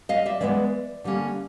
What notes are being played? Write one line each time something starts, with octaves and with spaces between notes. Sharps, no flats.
D#5 F5
D5 E5
E3 G#3 B3 D5 E5
D3 G3 A#3 C#4